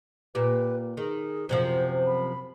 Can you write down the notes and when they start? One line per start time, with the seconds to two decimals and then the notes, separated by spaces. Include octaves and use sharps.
0.35 A#2 G4 B4
0.97 D#3 G#4
1.49 F#2 C3 F3 C5
2.07 B5